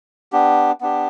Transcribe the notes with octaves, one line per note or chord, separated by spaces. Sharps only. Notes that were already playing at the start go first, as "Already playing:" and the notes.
B3 D4 G4
B3 D4 G4